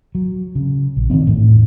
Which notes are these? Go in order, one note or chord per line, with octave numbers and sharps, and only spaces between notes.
F#3
C#3
A#1
D#3 E3 F#3 C4
E2 A2